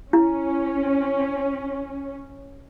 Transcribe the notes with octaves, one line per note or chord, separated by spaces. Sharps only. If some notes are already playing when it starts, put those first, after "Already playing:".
C#4 E4